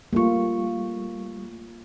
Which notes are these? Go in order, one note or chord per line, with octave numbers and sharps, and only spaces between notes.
G3 A3 A#3 F4 C#6